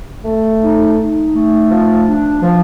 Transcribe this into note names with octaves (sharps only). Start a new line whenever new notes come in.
A3
D#4
D#4
A3
F3
D4
F3